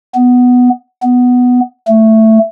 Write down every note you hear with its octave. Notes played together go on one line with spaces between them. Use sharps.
B3
B3
A3